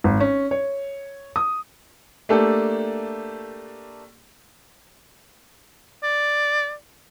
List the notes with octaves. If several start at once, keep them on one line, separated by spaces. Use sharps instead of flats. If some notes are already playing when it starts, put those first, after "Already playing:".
G#1
C#4
C#5
D#6
A3 A#3 D4 G4 A4
D5